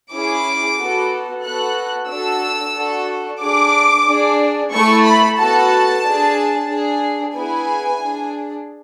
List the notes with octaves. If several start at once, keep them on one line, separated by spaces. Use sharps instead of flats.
C#4 E4 G#4 D6
B3 F#4 A4
B3 F#4 A4 F#6
D4 F#4 A4 E6
D4 F#4 A4
D4 G#4 D6
D4 G#4
A3 E4 A4 C#6
B5
B3 F#4 A4 A5
D4 G#4
D4 G#4
B3 E4 G#4 G#5
D4 G#4